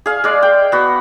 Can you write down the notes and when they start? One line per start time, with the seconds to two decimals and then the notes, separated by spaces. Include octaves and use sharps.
0.06 G#4 F5
0.24 G#3 D5
0.43 G5
0.72 B3 F#4